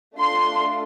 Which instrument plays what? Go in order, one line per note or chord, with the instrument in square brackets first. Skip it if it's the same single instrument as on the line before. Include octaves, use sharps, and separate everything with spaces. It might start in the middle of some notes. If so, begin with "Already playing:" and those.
[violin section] A3 D4 F4 A4 C6